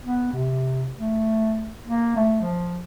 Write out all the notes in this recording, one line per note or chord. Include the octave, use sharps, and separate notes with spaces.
B3
C3
A3
A#3
A3
F3